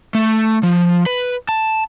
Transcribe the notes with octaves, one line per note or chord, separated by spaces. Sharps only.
A3
F3
B4
A5